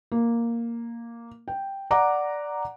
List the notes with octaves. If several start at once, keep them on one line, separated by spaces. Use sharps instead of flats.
A#3
G5
D5 F#5 A#5 D6